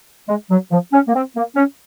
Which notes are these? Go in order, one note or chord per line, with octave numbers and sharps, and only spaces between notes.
G#3
F#3
F3
C#4
A#3
C4
A#3
C#4